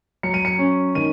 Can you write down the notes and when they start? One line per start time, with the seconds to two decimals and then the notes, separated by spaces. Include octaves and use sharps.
0.23 F#3 C#7
0.34 D#7
0.45 C#7
0.59 C#4
0.95 D#3 D#7